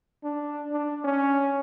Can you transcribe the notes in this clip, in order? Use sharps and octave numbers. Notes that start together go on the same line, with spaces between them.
D4
D4
C#4